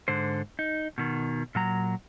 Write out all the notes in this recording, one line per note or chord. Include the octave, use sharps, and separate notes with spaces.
G#2 D3 C5
D#4
B2 D#3
A#2 F#3 A#5